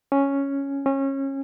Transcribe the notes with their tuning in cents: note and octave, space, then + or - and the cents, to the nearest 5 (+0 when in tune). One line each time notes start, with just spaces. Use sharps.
C#4 +0
C#4 -25